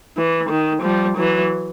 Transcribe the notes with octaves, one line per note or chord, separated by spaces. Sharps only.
E3
D#3
F3 G3
E3 F#3